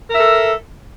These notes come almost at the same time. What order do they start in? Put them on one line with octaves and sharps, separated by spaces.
A#4 E5 A4